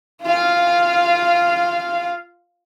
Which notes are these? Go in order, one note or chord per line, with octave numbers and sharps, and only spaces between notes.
F4 F5